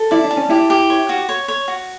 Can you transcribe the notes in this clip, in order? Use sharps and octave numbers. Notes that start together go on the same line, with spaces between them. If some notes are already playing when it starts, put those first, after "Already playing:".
Already playing: A4
E4 D5
D4
A5
C#4
E4 G4
G4
C#5
F#4
C#5
C#5
F#4